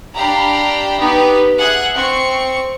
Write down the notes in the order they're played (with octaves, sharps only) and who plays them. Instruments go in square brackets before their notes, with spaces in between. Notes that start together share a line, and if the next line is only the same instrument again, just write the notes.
[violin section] D4 G4 F5 G5 A#5 B5
B3 D#4 G4 B4
G#4 E5 F#5 F#6
C4 C#6 C#7